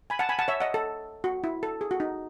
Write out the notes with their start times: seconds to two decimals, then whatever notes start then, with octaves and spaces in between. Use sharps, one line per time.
0.10 G#5 B5
0.19 F#5 A5
0.29 G#5 B5
0.39 F#5 A5
0.48 C#5 E5
0.60 D#5 F#5
0.74 A4
1.24 F#4
1.44 E4
1.63 A4
1.81 G#4
1.91 F#4
2.00 D#4